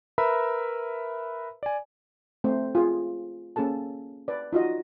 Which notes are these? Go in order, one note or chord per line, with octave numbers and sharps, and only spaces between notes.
A#4 B4 E5 A#5 B5 E6
D5 G#5
A3 C4 C5
F4 G#4
A#3 C#4 G#4 A4 A5
B4 D5
D#4 F4 F#4 D#5